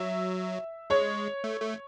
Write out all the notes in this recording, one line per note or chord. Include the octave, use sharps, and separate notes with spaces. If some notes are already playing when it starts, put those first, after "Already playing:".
Already playing: F#3 E5
G#3 C#5
A3
A3